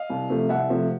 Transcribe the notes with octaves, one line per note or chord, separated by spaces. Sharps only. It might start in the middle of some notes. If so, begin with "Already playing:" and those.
Already playing: D#5 F5
C2
C3 F3 A3
C2 E5 F#5
C3 F3 A3